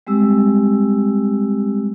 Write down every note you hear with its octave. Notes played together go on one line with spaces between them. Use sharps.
G3 G#3 C4 G4 E6